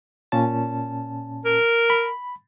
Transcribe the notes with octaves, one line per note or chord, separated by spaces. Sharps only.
A#2 C#4 A5
A#4
B5